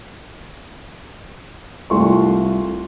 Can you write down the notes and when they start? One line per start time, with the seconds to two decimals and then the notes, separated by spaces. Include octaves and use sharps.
1.90 C2 A3 F4 C6 C#6